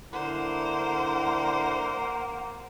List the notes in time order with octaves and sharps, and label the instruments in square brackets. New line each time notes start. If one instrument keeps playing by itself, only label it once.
[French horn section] D3 E4 [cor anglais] A#3 [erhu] C5 [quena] F#5